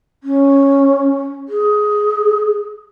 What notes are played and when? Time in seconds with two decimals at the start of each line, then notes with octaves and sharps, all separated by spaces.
0.24 C#4
1.49 G#4